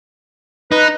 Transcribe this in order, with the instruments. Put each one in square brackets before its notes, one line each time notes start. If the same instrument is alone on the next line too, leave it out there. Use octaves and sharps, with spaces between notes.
[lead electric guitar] D#4 [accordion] B4